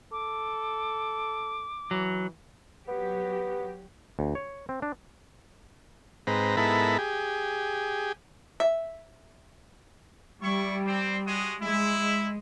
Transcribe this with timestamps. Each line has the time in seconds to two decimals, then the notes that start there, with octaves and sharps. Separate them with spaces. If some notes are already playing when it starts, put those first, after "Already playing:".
0.12 A4 D6
1.91 E3 F#3
2.88 F#3 B3 G4
4.19 D2
4.35 C#5
4.69 C4
4.82 D4
6.27 G#2 C4 B4 A#5
6.57 G#2 B3 E4 A4 A#4 B5
6.98 G4 G#4
8.60 E5
10.42 G3 E4 C#6
10.86 C4
11.25 G#3 F#4 D#6
11.60 G#3 E4